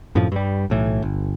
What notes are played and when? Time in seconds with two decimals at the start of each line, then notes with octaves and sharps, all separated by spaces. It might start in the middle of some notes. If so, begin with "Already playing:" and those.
0.15 F#2 A2 C3 F3
0.32 G2 G3
0.70 B1 A2 E3
1.02 G1